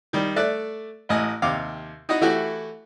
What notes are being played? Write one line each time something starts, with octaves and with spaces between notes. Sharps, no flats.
D#3 G3
A3 D5 E5 F#6
A1 A2 D#5 G#5
D#2 C3 F5 D6
D#4 E4 F#4 D#5
E3 A3 E4 F#4 G4